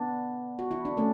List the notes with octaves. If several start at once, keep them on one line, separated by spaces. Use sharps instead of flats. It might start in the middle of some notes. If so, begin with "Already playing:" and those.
Already playing: B3 D4
F#4
E4
D4
A3 C#4